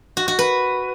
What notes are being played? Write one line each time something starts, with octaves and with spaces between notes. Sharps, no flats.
F#4
F#4
B4